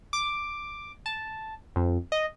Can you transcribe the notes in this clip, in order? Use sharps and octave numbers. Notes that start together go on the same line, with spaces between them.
D6
A5
F2
D#5